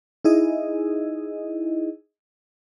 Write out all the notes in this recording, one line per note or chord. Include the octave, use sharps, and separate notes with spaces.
D#4 E4 G#4 D#5